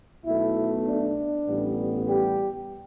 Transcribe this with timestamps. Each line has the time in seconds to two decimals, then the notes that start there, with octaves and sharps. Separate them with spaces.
0.25 B1 B2 A3 E4
0.86 D4
1.47 A1 A2 G3 B3
2.06 G3 G4